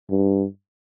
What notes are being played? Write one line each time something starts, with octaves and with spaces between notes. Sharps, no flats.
G2